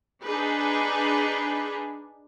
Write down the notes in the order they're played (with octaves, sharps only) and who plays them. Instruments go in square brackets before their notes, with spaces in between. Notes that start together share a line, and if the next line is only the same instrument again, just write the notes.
[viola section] D4 D#4 G#4 B4